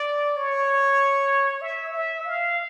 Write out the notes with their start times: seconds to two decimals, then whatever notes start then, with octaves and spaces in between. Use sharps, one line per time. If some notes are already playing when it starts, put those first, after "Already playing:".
Already playing: D5
0.36 C#5
1.61 E5
1.93 E5
2.25 F5